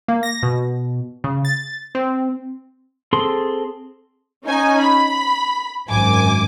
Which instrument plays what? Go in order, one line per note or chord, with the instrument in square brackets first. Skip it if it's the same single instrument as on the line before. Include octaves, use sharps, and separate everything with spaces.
[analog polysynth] A#3
A#6
B2
C#3
A6
C4
[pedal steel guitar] C4 G#4 A4 C6
[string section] C#4 D#4 G#5
B5
G#1 F#2 G#5 D6